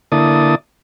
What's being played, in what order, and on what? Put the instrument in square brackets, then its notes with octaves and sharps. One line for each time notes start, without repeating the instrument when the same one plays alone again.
[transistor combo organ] D3 A#3 E4 D5 A5 D#6